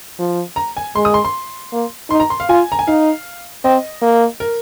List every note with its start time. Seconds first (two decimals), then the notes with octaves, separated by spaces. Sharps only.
0.19 F3
0.56 A#5
0.77 G#5
0.96 G#3 C6
1.05 D#6
1.14 C6
1.25 C6
1.73 A#3
2.10 D#4 C6
2.20 A#5
2.30 C6
2.40 F5
2.49 F4 G#5
2.72 A#5
2.79 G#5
2.87 D#4 F5
3.64 C4 D#5
4.02 A#3
4.40 A#4